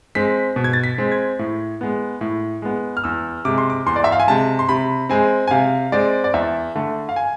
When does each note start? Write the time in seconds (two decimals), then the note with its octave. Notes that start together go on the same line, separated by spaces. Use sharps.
0.15 G#3 C4 B6
0.56 B2
0.64 G#6
0.73 A6
0.84 B6
0.98 G#3 C4
1.12 G#6
1.39 A2
1.81 G#3 B3
2.21 A2
2.62 G#3 B3
2.97 F6
3.04 E2 E6
3.45 C3 G#3 D6
3.58 C6
3.70 D6
3.86 E2 C6
3.96 D5
4.04 E5
4.12 F5
4.20 G#5
4.27 C3 G#3 A5
4.59 C6
4.69 C3 B5
5.09 G#3 C4 G#5
5.48 G#5
5.51 C3 F5
5.92 G#3 C4 D5
6.24 D5
6.34 E2 E5
6.75 D3 A3
7.09 F5
7.16 G#5